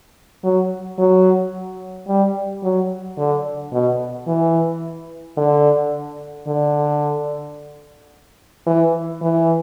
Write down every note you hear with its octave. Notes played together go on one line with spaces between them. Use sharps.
F#3
F#3
G3
F#3
D3
B2
E3
D3
D3
E3
E3